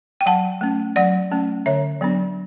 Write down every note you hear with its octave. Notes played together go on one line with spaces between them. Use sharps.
G5
F#3 F#5 A5
A3 C#4
F#3 D5 F#5
A3 C#4
D3 C#5 E5
F#3 B3 D4